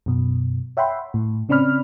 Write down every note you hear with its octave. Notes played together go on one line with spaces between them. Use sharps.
F#2 B2
C#5 E5 F#5 G5 B5 C6
A2
C#3 C4 C#4 D5 B5 F6